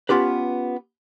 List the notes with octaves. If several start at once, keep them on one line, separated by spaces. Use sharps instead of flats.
B3 C#4 F4 G4 B4